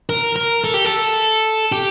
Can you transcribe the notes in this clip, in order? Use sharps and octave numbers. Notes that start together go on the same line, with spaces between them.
A#4
A#4
A4
G4
A4
G4